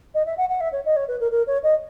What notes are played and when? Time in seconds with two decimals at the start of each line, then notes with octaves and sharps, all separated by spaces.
0.14 D#5
0.26 E5
0.37 F#5
0.49 F#5
0.61 E5
0.72 C#5
0.85 D#5
0.96 C#5
1.08 B4
1.20 A#4
1.31 A#4
1.47 C#5
1.63 D#5